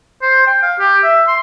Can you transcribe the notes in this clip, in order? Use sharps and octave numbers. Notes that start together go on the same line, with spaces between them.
C5
G5
F5
G4
E5
C6